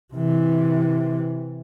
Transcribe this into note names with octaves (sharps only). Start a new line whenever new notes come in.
C3 E3